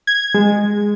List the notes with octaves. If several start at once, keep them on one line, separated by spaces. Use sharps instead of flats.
G#6
G#3